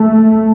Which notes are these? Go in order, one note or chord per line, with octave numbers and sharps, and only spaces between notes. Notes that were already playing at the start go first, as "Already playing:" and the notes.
Already playing: A3